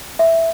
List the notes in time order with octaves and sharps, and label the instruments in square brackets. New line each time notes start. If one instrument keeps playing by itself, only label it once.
[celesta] E5